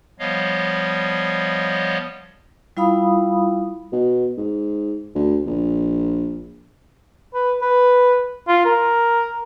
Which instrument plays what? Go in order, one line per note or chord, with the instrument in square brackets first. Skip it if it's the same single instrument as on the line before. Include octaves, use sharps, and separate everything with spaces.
[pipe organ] F3 G3 B3 C#5 D#5 F5
[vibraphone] G3 E4 F4 F5 B5 D#6
[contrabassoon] B2
G#2
D2
A#1
[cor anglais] B4
B4
F4
A#4